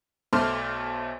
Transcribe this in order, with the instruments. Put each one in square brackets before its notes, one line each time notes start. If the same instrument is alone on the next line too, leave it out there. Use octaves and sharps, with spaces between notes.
[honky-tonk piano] B1 A3 C5 C6 D6 F6